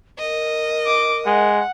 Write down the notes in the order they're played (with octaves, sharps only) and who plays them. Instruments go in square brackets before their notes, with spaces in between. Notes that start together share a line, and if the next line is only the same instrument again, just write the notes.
[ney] A#4 [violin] D#5
[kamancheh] D6
[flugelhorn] G#3 [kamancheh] F#5